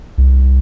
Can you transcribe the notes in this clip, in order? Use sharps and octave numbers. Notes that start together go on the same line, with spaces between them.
C2